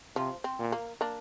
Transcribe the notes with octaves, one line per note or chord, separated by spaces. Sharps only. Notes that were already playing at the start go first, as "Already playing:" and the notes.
C3 F3
C4
A#2
A#3
A#3 D4